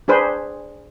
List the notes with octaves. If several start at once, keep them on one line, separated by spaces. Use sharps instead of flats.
D4 G#4 B4 C5